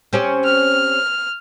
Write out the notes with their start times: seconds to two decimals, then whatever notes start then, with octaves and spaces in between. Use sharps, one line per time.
0.13 C4 C#4 G4
0.44 F6